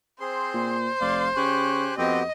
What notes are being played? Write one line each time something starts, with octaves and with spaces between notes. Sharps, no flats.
C4 G#4 C5 C6
A#2
F1 D5 F5 C6
C#3 G4 G#5 C#6 F#6
F2 B3 C4 F#4 G4 D#5